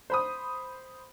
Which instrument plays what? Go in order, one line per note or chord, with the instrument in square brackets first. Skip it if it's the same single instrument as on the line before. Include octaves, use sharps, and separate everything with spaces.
[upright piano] C5 B5 D#6